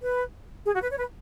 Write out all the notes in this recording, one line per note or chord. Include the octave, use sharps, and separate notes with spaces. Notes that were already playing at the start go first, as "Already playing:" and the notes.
B4
G#4
F#4
B4
C#5
B4